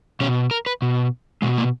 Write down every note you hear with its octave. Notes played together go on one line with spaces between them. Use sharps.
B2 C#4
A#4
B4
B2
B2 G#3
A#3